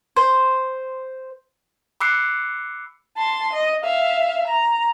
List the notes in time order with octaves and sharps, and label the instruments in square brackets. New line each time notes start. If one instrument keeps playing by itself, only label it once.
[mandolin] C5
[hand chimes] B5 D6 E6 F#6 C7 C#7
[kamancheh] A5 C6
D#5
E5 F5
A#5